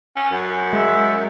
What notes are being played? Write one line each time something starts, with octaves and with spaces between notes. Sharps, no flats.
C#4
F#2
G#3 E5